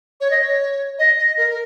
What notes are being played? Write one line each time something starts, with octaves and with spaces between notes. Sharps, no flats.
C#5
D#5
C#5
D#5
D#5
A#4
A#4